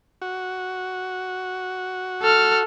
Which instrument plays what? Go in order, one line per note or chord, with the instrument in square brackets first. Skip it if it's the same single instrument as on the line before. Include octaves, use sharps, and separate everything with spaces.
[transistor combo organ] F#4
[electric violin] A4 F6